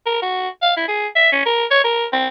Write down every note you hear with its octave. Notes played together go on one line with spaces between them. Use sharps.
A#4
F#4
F5
E4
G#4
E5
C#4
A#4
C#5
A#4
C4